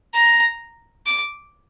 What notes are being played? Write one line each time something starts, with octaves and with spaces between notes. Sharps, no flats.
A#5
D6